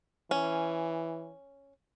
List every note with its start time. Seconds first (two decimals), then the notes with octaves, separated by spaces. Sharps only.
0.31 E3 C#4